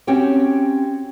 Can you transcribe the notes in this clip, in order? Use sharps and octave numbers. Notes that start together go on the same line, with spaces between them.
C4 C#4 F#4 G4 C#5 G5